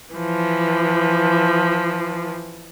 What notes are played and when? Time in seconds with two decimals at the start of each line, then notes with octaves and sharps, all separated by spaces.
0.14 E3 F3